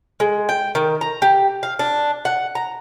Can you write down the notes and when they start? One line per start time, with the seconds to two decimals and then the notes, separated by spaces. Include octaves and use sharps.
0.20 G#3
0.49 G5
0.75 D#3
1.01 A#5
1.22 G4
1.63 F5
1.79 D4
2.25 F#5
2.55 A#5